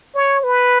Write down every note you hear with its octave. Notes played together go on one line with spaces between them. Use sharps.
C#5
B4